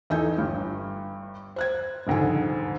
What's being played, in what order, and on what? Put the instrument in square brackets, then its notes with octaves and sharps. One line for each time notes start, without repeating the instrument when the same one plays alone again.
[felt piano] E2 D#4 A4 D#5 G#5 G6
G1 G2
C5 F#6 G#6
D#1 F2 G#2 D3 G#5